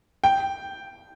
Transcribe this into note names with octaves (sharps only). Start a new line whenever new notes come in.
G5